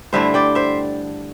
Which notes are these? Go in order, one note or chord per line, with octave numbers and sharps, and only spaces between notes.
G2 D3 A3 E4 C5 E5
D5 G5
C5 E5